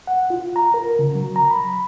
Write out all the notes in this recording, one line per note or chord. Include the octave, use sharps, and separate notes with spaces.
F#5
F4
A#5
A#4
C#3
F#3
A#5
B5